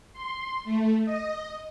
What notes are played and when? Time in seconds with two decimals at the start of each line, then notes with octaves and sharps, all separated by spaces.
0.13 C6
0.65 A3
1.05 D#5